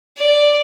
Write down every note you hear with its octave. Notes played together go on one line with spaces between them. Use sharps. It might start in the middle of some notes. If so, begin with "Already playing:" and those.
D5